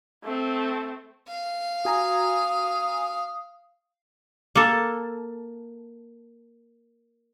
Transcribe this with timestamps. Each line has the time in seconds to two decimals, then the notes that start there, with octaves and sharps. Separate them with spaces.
0.24 A3 C4
1.28 F5
1.85 F#4 G#5 A#5 D#6
4.55 A#3 A4